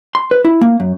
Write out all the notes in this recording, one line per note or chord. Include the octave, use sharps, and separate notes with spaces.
C6
B4
E4
A#3
F#2